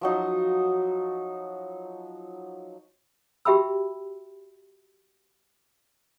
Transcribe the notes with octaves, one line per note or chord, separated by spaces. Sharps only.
F3 F#3 D#4
F#4 G4 E5 G5 B5 E6